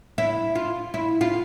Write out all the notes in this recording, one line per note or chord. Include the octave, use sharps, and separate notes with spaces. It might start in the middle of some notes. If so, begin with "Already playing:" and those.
E4
F4
E4
F4